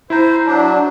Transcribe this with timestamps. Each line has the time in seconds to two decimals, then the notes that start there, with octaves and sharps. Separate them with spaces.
0.10 E4 C5 A#5
0.46 F#3 D4